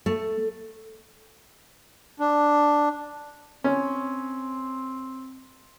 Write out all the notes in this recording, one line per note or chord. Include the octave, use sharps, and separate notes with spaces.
A3
D4
C4 C#4